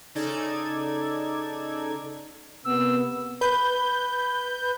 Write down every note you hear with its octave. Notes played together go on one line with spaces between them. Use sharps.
C#3 D#4 A4 D5 G#6
C3 A#3 B3 E6
B4 G6